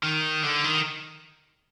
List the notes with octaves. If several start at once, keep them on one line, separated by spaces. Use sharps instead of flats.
D#3
D3
D#3